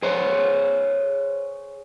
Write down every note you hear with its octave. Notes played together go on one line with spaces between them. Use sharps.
G#4 C5 C#5